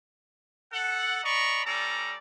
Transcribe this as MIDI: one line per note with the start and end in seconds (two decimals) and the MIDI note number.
0.72 1.19 69
0.72 1.19 78
1.23 1.63 74
1.23 1.63 75
1.23 1.63 82
1.23 1.63 83
1.23 1.63 85
1.66 2.16 55
1.66 2.16 61
1.66 2.16 69
1.66 2.16 74
1.66 2.16 82